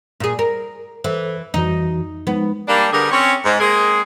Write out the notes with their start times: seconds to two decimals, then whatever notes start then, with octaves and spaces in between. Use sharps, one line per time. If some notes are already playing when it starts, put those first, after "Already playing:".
0.20 A#2 G#4
0.39 A#4
1.04 E3 A4 C5
1.54 F2 E3 D#4 F#4
2.27 F3 G#3 B3 D#4
2.68 G3 A#3 D4
2.92 D3 G3 B3 G4 G#4 A#4
3.12 C4 C#4 C#5
3.45 G#2
3.59 G#3 A#3 C4 G#4